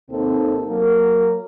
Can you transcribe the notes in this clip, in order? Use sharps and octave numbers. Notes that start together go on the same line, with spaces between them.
D#2 C3 A#3 C4 D#4 A4
F#3 A#3 A#4